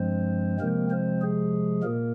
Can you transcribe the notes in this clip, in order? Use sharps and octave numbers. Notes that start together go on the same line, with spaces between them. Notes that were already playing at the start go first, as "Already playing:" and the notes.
Already playing: G2 F3 G#3 C4 C5
C3 F3 G#3 A#3 C4 A#4
C4 C5
G#4
A#2 A#3 A#4